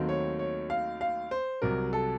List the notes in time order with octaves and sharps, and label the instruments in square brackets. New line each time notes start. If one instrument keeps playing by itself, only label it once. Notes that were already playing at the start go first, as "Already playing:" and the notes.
Already playing: [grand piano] D#2 D#3 F#3 A3 C4
C#5
C#5
F5
F5
C5
C2 C3 F#3 A#4
A4